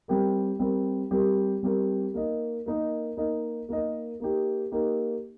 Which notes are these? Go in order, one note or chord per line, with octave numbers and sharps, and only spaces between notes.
G3 C4 G4 A#4
G3 C4 G4 A#4
G3 C4 G4 A#4
G3 C4 G4 A#4
A#3 D#4 A#4 D#5
A#3 D#4 A#4 D#5
A#3 D#4 A#4 D#5
A#3 D#4 A#4 D#5
A#3 D#4 G4
A#3 D#4 G4